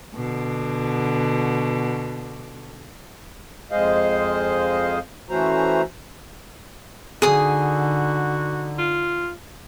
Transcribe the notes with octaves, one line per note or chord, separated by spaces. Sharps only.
B2 D3
F2 G#3 G#4 C5 D#5 F5
E3 A3 C#4 F#4 C5 A#5
D3 D#4 F#4 G#4 D#6
F4